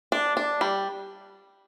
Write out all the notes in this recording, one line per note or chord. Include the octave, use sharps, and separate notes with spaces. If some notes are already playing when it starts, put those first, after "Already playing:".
D4
D4
G3